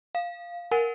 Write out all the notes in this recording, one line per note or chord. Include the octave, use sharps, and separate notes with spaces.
F5
A#4 F#5 G#5